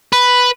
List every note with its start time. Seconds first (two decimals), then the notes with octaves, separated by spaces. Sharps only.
0.13 B4